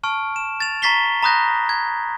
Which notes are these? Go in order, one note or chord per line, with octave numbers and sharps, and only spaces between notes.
A5 C#6 F6 D7
E7
A6 F7
A#5 C#6 A6 B6 C7 G7
A#5 B5 D#6 F#6 G6 A#6
G#6